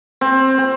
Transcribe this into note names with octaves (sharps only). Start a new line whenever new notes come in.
C4
C4